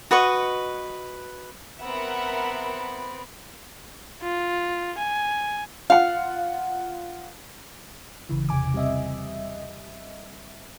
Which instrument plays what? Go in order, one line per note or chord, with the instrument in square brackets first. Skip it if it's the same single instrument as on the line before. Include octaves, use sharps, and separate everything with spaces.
[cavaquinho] F#4 B4 D#5 C#6
[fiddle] B3 C4 [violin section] A#4 E5 F#5 [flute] B5
[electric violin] F4
G#5
[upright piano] F4 F#5 [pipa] F5
[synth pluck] G1 C#3 E3
E2 C3 G#5 D6
G3 C4 D#5 E5